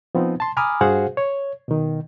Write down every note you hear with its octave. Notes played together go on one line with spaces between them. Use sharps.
F3 B3 C4 D#4
A5 C6
G#5 A#5 B5 D6 D#6 F6
G2 F#4 G#4 C5 F5 F#5
C#5
B2 D#3